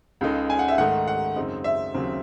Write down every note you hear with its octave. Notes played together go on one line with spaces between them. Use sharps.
C#2 C#3 G#3 D#4 A4
G#5
F#5
E5
G#2 D#3 A3 D#4 A4 F#5
F#5
F#2 C#3 G#3 C4 D#4
E5
D#2 C#3 F#3 C4